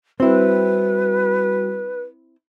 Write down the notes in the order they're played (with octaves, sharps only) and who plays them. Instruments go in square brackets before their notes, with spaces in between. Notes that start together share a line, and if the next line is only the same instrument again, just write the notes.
[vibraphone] G3 F#4 [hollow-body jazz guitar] C4 E4 [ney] B4